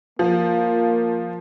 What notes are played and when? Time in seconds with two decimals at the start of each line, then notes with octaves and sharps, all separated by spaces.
0.19 F3 A#3